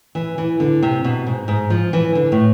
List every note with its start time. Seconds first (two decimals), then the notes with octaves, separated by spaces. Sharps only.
0.15 E3
0.38 E3
0.60 D3
0.83 C3
1.04 B2
1.26 G#2
1.48 G#2
1.70 F3
1.93 E3
2.15 D3
2.32 A2